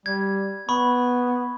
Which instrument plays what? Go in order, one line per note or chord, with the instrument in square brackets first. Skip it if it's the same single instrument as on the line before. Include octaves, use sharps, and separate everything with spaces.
[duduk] G3 [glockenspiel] G#6
[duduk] B3 [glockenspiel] B5 C#6